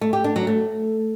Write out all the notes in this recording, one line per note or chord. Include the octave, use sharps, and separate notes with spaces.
A3
G4
D4
F#3
A3